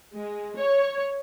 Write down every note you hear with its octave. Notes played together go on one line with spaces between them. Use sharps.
G#3
C#5